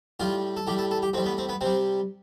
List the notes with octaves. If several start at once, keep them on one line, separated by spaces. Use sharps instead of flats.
A2 G3 F4
A4
A2 G3 G4
A4
A4
G4
A2 G3 C4
B3
C4
B3
C3 G3 C4